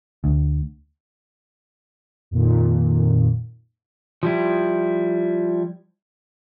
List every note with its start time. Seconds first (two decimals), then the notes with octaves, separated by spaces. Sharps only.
0.24 D2
2.31 F2 A#2 D#3
4.23 F3 G3 E4